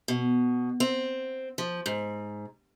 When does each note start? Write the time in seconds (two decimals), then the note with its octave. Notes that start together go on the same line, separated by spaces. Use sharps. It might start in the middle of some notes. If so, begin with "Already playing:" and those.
0.08 B2
0.80 C4
1.58 F3
1.86 G#2